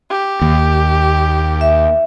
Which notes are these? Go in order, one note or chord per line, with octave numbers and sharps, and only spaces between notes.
G4
D#2
E5